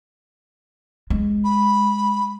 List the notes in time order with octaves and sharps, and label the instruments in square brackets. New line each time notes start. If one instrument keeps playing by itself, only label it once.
[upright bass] G#3
[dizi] B5